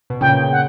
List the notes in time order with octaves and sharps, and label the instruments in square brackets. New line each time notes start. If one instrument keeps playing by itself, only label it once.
[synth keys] B2
[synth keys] A#2 C#3 [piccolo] G5
[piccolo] F#5